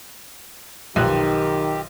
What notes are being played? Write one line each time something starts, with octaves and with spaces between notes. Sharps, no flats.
B1 D#3 F3 G4 F#6